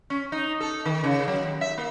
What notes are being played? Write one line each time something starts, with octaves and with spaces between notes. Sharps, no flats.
C#4
D#4
A4
D#3
C#3
F#3
D#2
E5
A#3